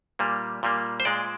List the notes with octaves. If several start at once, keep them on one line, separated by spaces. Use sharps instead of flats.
A#2 G3 A#3
A#2 G3 A#3
C5
A#2 G#3 D5